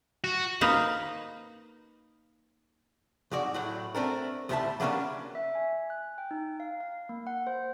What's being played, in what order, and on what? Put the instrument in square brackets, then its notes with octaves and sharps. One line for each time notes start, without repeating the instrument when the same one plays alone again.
[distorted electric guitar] F#4
[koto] A#3 D#4 B4
[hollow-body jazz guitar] F2 G#2 F#4 D5
A2 F#3 F#4
A3 C4 D4 A#4
D2 A2 G3 C#5 E5 A5
E3 F#3 G3 A#3 C#4 D4
[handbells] E5
G#5
F#6
G5
D#4
F5
F5
A#3
F#5
C5